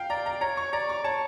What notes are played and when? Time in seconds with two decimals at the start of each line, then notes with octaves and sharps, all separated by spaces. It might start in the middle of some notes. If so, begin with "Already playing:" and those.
Already playing: F5 G5
0.10 D5 A#5
0.26 A#5
0.41 C#5 A#5
0.57 C#6
0.73 D5 A#5
0.89 C#6
1.04 C#5 A5